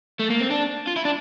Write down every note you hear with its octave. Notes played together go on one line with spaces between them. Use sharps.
A3
A#3
C4
D4
F4
E4
D4